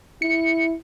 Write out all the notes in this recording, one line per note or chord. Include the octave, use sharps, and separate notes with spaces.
E4 C#7